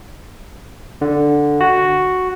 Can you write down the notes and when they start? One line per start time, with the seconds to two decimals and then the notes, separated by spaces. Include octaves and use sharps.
1.01 D3
1.61 F#4